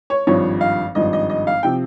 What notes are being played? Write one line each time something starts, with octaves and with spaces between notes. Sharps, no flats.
C#5
G#1 G2 F3 C#5
F5
G#1 G2 F3 D#5
D#5
D#5
F5
C3 F3 G5